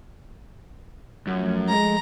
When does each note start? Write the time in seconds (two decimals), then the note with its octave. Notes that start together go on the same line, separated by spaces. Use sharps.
1.27 F#2 F3 A3
1.69 G#3 A#5